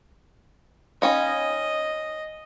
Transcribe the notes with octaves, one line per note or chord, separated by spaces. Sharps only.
C#4 D#4 D#5 F5 G5 B5